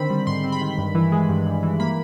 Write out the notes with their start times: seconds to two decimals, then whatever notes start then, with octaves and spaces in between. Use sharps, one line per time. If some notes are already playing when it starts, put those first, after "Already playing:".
Already playing: D3 D#3 C4 B5
0.10 G3
0.27 G#2 C6
0.44 C4
0.52 B5
0.61 D#3
0.78 G2
0.95 E3
1.12 G#3
1.29 G2
1.46 G2
1.63 E3
1.80 A#3 B5